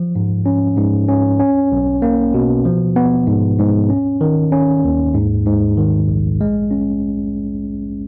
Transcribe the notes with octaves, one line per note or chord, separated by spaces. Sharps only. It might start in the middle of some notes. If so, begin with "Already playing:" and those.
Already playing: F3
G#2
C#4
G#2
C#4
C#4
B1
A#3
B2
F3
B3
G#2
G#2
C#4
D#3
C#4
D#2
G#2
G#2
D#3
A#1
G#3
C#4